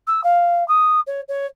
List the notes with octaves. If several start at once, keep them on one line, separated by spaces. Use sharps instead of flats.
E6
F5
D#6
C#5
C#5